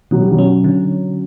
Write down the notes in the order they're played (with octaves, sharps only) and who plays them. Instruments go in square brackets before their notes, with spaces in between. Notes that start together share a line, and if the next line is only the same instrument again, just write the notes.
[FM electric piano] B2 [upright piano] F#3
[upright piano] G3
F#3
[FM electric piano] C#4
D3